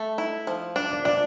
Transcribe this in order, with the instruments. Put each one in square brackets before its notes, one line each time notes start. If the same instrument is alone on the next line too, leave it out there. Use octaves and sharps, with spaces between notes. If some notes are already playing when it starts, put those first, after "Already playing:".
Already playing: [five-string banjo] A3
E4
F3
D4
[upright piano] D5
[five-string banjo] D4 [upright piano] D5